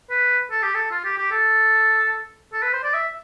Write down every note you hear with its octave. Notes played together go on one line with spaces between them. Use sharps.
B4
A4
G4
A4
F4
G4
G4
A4
A4
B4
C5
D5
E5